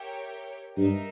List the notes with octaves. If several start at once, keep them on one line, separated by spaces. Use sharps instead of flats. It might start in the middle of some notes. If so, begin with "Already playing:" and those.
Already playing: G4 A#4 C#5 E5 G5
G2 D#4 A#4 E5